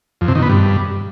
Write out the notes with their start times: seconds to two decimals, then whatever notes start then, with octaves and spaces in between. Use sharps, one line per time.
0.21 F2
0.28 C3
0.35 D#3
0.42 B3
0.50 G2